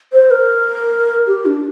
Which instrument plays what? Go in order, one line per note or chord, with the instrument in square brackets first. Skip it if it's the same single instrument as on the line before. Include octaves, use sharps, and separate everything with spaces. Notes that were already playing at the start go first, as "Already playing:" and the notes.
[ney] C5
A#4
G4
D4